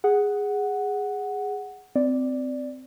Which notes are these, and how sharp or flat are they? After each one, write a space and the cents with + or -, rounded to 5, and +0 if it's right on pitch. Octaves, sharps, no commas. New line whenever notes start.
G#4 -10 F#5 +0
C4 -20 D5 +0